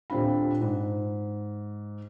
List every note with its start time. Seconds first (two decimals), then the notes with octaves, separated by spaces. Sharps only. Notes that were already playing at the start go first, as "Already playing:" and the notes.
0.10 D#1 C4 D4 F4 B5
0.61 G#2